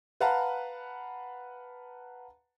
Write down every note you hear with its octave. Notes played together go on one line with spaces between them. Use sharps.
B4 F5 F#5 A5 A#5